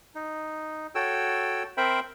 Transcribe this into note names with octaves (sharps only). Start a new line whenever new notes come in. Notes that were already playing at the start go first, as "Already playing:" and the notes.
D#4
F#4 A4 C#5 G5 E6
C4 A#4 C5 E5 G5 B5